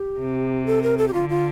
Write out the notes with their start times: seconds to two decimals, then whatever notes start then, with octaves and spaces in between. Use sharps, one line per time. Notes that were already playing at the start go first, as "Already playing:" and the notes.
Already playing: G4
0.19 C3
0.66 A4
0.83 A#4
0.98 A4
1.08 G4
1.13 D3 F4
1.29 F4